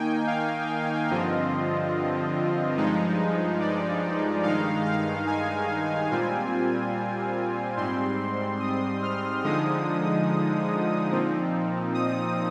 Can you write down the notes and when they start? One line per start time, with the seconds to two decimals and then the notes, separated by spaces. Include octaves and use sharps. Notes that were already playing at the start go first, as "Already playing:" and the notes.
Already playing: D#3 A#3 D#4 G5 G#5
0.27 F5
1.10 G2 D3 F3 C4 F4 D#5
2.77 G2 F3 G#3 D#4
3.60 D5
4.43 G2 D#3 G#3 D#4 F5
4.85 F5
5.27 G#5
6.10 A#2 G3 C4 F4 G#5
7.77 G#2 G3 C4 C6
8.60 D#6
9.03 F6
9.44 D3 F3 G#3 D#4 D#6
11.11 A#2 F3 C4 D#4
11.94 D#6